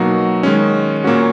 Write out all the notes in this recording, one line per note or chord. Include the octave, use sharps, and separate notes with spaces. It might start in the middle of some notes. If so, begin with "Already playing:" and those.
Already playing: B2 F#3 A#3 D#4 F#4
D#3 G#3 C#4
A#2 A#3 C#4 F#4